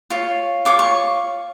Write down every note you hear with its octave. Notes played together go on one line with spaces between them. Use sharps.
F4 C#5
F4 C#5 D6
C#6